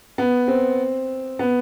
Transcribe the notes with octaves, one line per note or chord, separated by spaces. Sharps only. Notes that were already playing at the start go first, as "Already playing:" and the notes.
B3
C4
B3